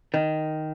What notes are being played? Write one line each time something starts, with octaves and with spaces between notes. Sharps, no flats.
D#3